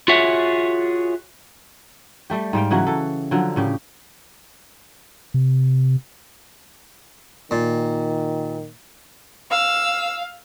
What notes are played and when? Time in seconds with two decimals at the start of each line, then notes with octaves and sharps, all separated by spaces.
0.08 F4 F#4 G#4 C#5 E5 F#5
2.30 G3 A3 G4
2.53 G#2 G3 F5 G5
2.71 C#3 E3 F#3 F#4
2.87 E3 A4
3.31 D3 F3 F#3
3.56 A2 C#3 G4
5.34 C3
7.51 A#2 D#3
9.51 F5 E6